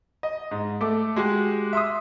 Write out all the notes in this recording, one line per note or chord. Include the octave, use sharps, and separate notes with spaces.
D#5
G#2
A3 D6
G#3 F#4 G4
E5 C6 D#6